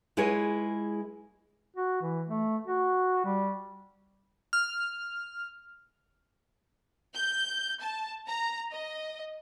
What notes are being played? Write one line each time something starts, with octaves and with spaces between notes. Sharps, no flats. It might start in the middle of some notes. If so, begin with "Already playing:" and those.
G#3 E4 F4 G#4 B4 C#5
F#4
E3
A3
F#4
G3
F6
G6
A5
A#5
D#5